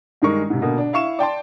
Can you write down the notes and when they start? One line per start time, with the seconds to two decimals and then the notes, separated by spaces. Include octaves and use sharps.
0.22 G2 D#3 G#3 A#4 C#6
0.50 G#2 C3
0.62 B2 D3 A#3
0.78 D4
0.93 E4 F5 C#6 E7
1.19 D5 G5 A5 C6